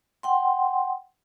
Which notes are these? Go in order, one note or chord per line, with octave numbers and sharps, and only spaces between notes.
F#5 G5 C6